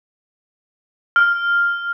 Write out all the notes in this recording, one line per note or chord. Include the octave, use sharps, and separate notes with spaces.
F6